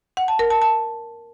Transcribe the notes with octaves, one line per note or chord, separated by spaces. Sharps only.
F#5
A5
A#4
A5
A5